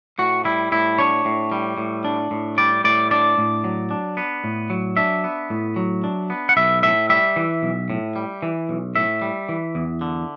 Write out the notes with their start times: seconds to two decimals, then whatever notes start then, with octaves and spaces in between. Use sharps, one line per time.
0.19 A2 F#4
0.45 G3 E4
0.72 A2 E4
0.98 D4 C#5
1.25 A2
1.52 G3
1.78 A2
2.05 D4
2.31 A2
2.58 G3 D5
2.84 A2 D5
3.11 D4 D5
3.38 A2
3.64 F#3
3.91 D4
4.17 B3
4.44 A2
4.70 F#3
4.97 D4 E5
5.24 B3
5.50 A2
5.76 F#3
6.04 D4
6.30 B3
6.49 F#5
6.57 B1 E5
6.83 A2 E5
7.09 G3 E5
7.36 E3
7.63 B1
7.90 A2
8.16 G3
8.42 E3
8.69 B1
8.95 A2 E5
9.22 G3
9.49 E3
9.75 E2
10.01 D3